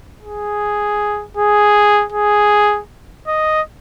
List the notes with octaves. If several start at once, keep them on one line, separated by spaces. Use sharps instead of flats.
G#4
G#4
G#4
D#5